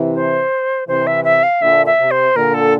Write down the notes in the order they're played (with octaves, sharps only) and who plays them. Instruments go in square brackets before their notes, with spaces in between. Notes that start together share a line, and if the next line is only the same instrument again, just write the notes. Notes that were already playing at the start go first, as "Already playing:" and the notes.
Already playing: [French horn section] C3 E3
[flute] C5
[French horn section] C3 E3 [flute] C5
[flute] E5
E5
F5
[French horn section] A#2 D3 [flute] E5
[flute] E5
[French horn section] C3
[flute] C5
[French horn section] A#2 D3 [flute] A#4
[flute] A4